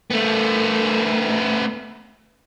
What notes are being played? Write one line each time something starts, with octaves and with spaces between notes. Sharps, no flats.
A3 B3